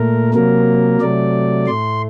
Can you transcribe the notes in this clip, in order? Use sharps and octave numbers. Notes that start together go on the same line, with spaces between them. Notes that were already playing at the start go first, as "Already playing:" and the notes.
Already playing: A#2 A3 A#4
C3 F#3 A#3 A#4
C3 F#3 A3 D5
A2 A3 C6